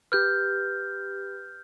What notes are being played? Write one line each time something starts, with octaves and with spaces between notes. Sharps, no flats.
G4 B4 F6 G6